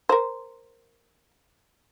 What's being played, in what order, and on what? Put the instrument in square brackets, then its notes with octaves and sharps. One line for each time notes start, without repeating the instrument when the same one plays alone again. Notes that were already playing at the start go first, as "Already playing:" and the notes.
[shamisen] A#4 C5